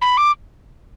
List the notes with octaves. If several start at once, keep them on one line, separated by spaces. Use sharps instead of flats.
B5
D6